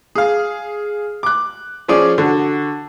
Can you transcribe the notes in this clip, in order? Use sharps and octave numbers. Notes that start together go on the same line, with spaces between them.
G#4 F5
D6 F#6
F3 C#4 G#4 D5
D3 F#4